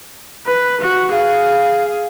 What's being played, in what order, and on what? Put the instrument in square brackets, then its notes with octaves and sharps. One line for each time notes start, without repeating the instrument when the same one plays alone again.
[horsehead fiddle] B4
F#4
[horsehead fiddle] G#4 [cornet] F5